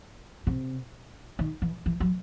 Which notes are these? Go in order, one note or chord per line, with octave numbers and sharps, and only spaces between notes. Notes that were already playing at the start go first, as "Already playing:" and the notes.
C3
D#3
E3
E3
F#3